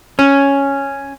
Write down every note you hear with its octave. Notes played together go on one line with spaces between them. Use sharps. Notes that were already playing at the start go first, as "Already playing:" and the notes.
C#4